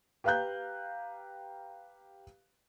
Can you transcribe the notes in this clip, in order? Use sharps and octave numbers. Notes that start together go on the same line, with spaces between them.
G4 B4 F5 A#5 F#6 G6